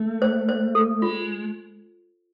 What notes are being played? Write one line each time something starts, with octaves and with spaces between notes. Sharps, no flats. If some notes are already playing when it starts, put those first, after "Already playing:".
Already playing: A3
C5
C5
A4
G#3 F4